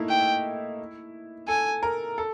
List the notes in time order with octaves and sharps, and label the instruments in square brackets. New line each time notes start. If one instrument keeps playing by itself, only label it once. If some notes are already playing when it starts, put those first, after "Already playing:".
Already playing: [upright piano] A3 A#3 D#4 E4
[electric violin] G5
[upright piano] A4 [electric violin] G#5
[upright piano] A#4
A4